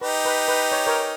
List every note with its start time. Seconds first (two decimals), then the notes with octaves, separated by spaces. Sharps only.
0.01 D#4 G4 B4
0.25 B4
0.48 B4
0.72 C#5
0.87 A#4 C#5